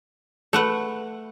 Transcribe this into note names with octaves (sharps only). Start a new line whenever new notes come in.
A3 A4 B4 F#5